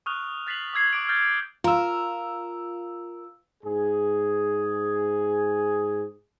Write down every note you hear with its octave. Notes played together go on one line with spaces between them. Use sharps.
C#6 D#6 F6 F#6 F7
F#6 A6 B6 C7 F7 F#7
D6 E6 G#6 C7
D6 D7
F6 G6 A6
F4 A#4 E6
G#2 G#4